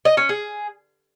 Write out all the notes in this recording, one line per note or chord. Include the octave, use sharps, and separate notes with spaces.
D#5
C#4
G#4